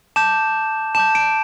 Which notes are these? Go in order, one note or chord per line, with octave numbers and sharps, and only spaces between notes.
A5 D6 G6 E7
A5 D6 G6 E7
D7